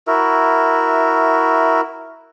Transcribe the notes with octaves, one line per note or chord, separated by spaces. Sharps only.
E4 F#4 A#4 E5